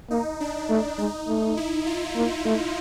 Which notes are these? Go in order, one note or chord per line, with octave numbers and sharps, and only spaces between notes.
A#3 D#4
D4
A3
G#3 D#4
A3
E4
F4
A#3
A3